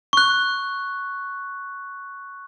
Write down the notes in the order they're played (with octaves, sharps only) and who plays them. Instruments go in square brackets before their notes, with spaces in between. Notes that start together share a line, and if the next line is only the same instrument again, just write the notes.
[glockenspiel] C#6 F#6